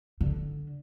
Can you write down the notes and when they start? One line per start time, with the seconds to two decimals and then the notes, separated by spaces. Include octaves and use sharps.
0.21 D3